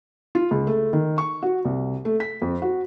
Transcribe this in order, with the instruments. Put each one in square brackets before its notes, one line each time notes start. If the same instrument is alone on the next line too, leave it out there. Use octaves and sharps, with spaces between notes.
[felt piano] F4
C#2
A3
D#3
C#6
F#4
C2
A3
B6
F2
F#4